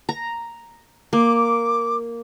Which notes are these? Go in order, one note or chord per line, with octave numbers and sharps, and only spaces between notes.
A#5
A#3 D6